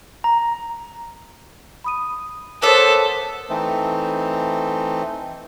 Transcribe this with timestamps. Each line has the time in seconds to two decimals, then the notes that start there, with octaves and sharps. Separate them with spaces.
0.24 A#5
1.84 B5 D#6 D#7
2.62 B3 A4 A#4 C5 C#5 E5 D6
3.50 E3 A3 C4 D#4